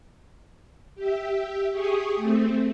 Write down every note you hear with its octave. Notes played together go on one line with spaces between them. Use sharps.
G4 E5
G4 G#4 C#6 D#6
A3 C4